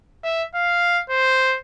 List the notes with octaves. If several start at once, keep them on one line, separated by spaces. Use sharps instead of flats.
E5
F5
C5